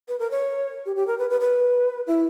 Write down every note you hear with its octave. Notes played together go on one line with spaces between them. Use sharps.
B4
A#4
C#5
G4
G4
A#4
B4
B4
B4
E4